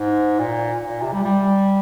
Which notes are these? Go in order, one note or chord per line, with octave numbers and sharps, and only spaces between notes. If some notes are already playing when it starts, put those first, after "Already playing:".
Already playing: G#2
A#2
A#2
C3
G3
G3